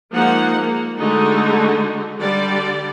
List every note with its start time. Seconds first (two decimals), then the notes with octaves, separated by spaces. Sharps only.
0.13 F3 G#3 A#3 D#4 F#5
0.58 A#3
0.98 D3 G#3 A3 D#4 F#4
2.18 D3 G3 G4 D5